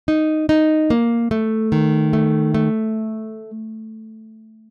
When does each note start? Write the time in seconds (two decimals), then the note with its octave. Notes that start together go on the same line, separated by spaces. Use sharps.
0.08 D#4
0.49 D#4
0.90 A#3
1.31 A3
1.72 D#3
2.13 A3
2.54 A3